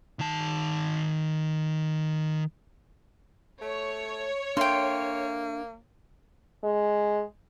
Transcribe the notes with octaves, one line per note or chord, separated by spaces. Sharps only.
D#3 A5
A3 C#5
A#3 D4 A4 E5 G5 C6
G#3